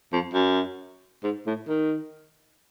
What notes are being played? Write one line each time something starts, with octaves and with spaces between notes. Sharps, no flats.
F2
F#2
G#2
A2
D#3